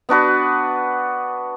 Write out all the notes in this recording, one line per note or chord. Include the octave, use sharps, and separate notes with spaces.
B3 D4 F#4 B4